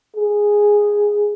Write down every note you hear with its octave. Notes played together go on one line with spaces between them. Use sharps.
G#4